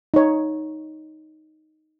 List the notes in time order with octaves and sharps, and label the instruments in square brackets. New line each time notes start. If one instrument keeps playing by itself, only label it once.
[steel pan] D#4 C#5